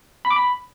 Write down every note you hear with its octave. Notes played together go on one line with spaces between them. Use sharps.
B5
D6
B5